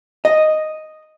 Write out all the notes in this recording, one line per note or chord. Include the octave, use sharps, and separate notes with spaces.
D#5